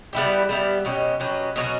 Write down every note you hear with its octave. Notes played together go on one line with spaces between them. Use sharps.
G3 B3 E4 G4
G3 B3 E4 G4
B2 F#3 C#4 G4
B2 F#3 C#4 G4
B2 F#3 C#4 F#4